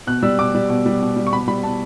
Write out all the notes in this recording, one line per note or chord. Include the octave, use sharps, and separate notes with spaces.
B2 F#6
G3 E6
B2 D6
G3
B2
G3
B2
G3
C#6
B2 B5
G3 B5
B2 A5